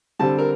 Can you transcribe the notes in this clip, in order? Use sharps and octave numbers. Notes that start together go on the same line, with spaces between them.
D3 G3 C4 A5
A#4